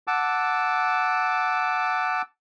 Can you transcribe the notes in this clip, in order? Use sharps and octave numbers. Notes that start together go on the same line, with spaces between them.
F#5 A5 D6 E6